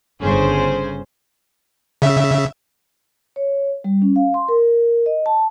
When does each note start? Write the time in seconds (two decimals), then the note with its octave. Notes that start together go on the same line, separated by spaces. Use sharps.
0.21 G1 G2 C#3 C#4 G#4 C5
2.02 C#3 E5
3.36 C#5
3.84 G3
4.02 C#4
4.16 F5
4.34 C6
4.48 A#4
5.06 D#5
5.26 A5